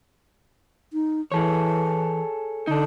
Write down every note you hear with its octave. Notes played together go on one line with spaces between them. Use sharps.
D#4
E3 G#4 A4 C#5
D3 D4 D#4